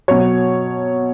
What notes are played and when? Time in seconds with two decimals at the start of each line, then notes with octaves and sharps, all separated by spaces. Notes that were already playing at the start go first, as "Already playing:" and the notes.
0.08 B2 F#3 C#5